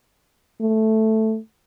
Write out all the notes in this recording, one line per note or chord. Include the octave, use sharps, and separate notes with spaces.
A3